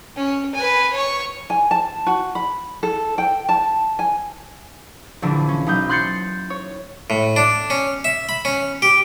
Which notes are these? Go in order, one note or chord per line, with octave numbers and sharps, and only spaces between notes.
C#4
B4 G#5
C#5 C#6
G#5
A5
F#4
B5
A4
G5
A5
G#5
A#1 D3 E3
C#4
B1 D#4 G6
C6 F#6 G6 A6 C7 C#7
C#5
A2
D4
C#4
E5
B5
C#4
G4